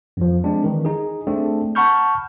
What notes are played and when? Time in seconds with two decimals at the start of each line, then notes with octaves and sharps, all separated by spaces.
0.17 F2 F3
0.44 G#3 C4 D4
0.64 D#3 E3
0.85 D#4 G#4
1.27 A3 C4 D4 G#4 A4
1.75 F#5 A5 B5 C#6 F6 G6